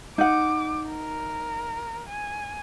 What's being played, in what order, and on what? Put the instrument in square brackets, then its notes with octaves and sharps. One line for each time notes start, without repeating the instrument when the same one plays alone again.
[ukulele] D#4 F#5 [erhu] D6
[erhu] A#4
G#5